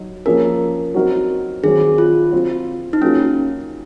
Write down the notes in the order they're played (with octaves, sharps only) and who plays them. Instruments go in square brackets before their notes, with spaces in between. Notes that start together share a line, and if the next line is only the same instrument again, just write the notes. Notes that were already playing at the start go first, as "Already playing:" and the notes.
Already playing: [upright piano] F#3 D#4
[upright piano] F3 A#3 C#4 G#4 [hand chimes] A#4
[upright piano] F#3 C4 D#4 F#4 A#4
[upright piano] D#3 F#3 C4 [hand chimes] G#4
[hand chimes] F4
[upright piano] F#3 C4 F4
[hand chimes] D#4
[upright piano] F#3 A#3 F4 G#4 [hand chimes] C#4